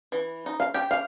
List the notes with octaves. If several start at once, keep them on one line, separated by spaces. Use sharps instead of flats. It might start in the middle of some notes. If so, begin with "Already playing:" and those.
E3
D#4
F5
G4
F5